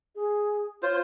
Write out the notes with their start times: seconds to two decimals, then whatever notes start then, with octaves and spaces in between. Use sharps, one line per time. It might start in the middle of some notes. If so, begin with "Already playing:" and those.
0.15 G#4
0.83 F4 C5 C#5